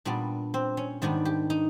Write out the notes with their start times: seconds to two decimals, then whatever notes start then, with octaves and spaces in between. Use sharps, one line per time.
0.05 A#2 G3 B3 D4
0.54 C4
0.77 C#4
1.02 G#2 D#3 G3 B3 D4
1.25 G4
1.50 D#4